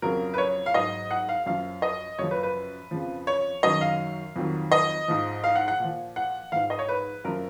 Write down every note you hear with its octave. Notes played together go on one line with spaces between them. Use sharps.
F2 C#3 F#3 A#4
B4
C#5
F5
G#2 F#3 D#5
F#5
F5
F#2 F3 F5
D#5
F#2 C#3 F3 C#5
B4
B4
F2 C#3 F3
C#5
F#2 D#3 F#3 D#5
F5
F2 D#3 F#3
D#5
G#2 F3
F5
F#5
F#5
A#2 F3
F#5
G#2 F3 F5
D#5
C#5
B4
F#2 F3 A#4